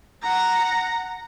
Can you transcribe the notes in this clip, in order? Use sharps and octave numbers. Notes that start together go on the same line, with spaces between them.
F#5 A#5